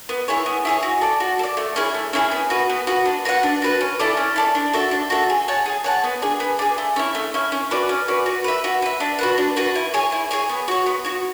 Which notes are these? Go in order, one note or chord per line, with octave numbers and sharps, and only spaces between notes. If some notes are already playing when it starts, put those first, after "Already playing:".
B3
E4 G#4 C#5
B3
E4 G#4 C#5
F#4
A4 D5
F#4
A4
D5
A3
C#4 E4 G#4
A3
C#4 E4 G#4
B3
F#4 B4
B3
F#4 B4
D4
F#4 B4 F#5
D4
F#4 B4 F#5
C#4
E4 A4 D5
C#4
E4 A4 D5
D4
F#4 A4 E5
D4
F#4 A4 E5
G#4
C#5 F#5 A5
G#4
C#5 F#5 A5
B3
D4 G#4
B3
D4 G#4
A3
C#4 E4
A3
C#4 E4
C#4
F#4 B4 D5
C#4
F#4 B4 D5
F#4
B4 E5
F#4
B4 E5
D4
F#4 B4 F#5
D4
F#4 B4 F#5
E4
G#4 C#5 G#5
E4
G#4 C#5 G#5
B3
F#4 C#5
B3
F#4 C#5